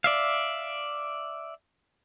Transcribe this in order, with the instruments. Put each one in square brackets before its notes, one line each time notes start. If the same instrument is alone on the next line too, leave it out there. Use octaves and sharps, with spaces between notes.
[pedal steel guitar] D5 E5 F5